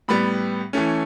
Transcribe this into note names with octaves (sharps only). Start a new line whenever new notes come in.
A2 G3 B3 B5
E3 A3 C#4